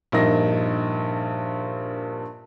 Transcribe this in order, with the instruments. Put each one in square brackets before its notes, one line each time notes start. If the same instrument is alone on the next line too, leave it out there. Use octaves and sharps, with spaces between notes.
[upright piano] A#1 G2 D#4 A#4 A#6